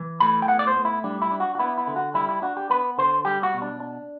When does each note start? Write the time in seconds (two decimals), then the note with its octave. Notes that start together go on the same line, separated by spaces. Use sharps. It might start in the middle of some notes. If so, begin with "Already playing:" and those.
Already playing: E3
0.20 A2 B5
0.42 G5
0.48 B3 F#5
0.59 D5
0.67 C5
0.76 A2
0.85 E4
1.04 G3 D4
1.22 E4
1.31 D4
1.40 F#4
1.55 F#4
1.59 B3 E4
1.78 E4
1.87 D3
1.96 F#4
2.14 G3 E4
2.29 E4
2.42 D4 F#4
2.57 G4
2.70 B3 B4
2.98 D3 C5
3.25 G3 G4
3.43 F#4
3.54 B2
3.62 D4
3.80 D4